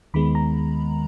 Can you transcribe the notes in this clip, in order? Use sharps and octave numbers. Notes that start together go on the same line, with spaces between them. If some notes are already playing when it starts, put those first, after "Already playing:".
D#2 D#3 G#3 B3 B5
A#5